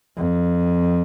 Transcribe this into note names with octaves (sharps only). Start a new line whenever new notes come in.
F2